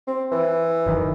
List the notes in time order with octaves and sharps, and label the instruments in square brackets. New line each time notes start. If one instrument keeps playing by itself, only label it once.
[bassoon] C4
E3
[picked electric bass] F#1 D#3